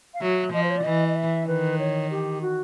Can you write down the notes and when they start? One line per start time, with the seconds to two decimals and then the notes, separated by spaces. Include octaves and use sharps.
0.14 F5
0.21 F#3 E5
0.53 F3 D#5
0.63 C5
0.70 C#5
0.77 D5
0.84 E3 D#5
1.08 D#5
1.16 E5
1.47 D#3 B4
1.79 C#5
2.11 G4
2.42 F#4